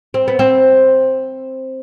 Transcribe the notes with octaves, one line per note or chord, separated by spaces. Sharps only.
C4
B3
C4